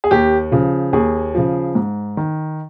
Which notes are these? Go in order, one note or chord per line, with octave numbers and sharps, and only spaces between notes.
G#4
D#2 G4
C#3 F3
D#2 G#4
C#3 F3
G#2
D#3